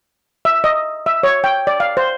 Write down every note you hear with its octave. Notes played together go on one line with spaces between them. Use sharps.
E5
D#5
E5
C#5
G5
D5
F5
C5